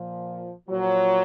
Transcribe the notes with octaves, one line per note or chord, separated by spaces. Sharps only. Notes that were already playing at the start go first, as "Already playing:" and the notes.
Already playing: A#2 F3
A#2 F3 F#3